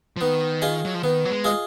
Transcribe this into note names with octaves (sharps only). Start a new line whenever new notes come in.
F3
D#3 B3
F4 G#4 D#5
F#3
F3
D#3 B3
F#3
G#3
F4 G#4 D#5